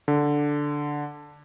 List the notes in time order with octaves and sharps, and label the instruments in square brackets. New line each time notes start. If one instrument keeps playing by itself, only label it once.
[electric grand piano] D3